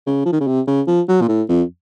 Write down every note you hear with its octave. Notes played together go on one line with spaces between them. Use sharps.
C#3
F3
D#3
C#3
C3
C#3
F3
F#3
A#2
A2
F2